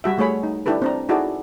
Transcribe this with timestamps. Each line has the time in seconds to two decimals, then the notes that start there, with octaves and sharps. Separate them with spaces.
0.04 G3 F#4 E5
0.18 G3 A3 G#4 C#5 B5
0.43 D#4
0.66 D4 E4 G4 A4 B4
0.82 C4 D4 A#5
1.09 D#4 E4 F#4 G#4 A4 D5